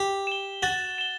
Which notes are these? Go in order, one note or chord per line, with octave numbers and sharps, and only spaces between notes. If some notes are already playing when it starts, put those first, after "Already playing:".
Already playing: G4
E7 G7
F#4 A6
E7 G7